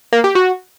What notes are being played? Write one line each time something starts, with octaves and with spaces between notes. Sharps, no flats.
A#3
G4
F#4